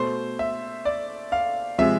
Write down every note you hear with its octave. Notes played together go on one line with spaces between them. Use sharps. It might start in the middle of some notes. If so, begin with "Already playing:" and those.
Already playing: B2 A3 C5
E5
D5
F5
C3 F3 G#3 E5